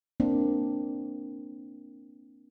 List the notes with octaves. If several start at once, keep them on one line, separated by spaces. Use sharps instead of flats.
A#3 C4 D4